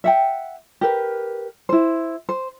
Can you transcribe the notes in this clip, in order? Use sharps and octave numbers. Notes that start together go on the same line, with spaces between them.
E5 F#5 G5
G4 A#4 B4
E4 C5
C5